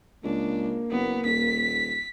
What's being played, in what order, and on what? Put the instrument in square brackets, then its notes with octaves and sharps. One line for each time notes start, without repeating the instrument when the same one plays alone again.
[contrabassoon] C#2 [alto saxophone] A#3 [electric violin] D4
[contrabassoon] F#1 [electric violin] B3
[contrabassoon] D#1 [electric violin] B6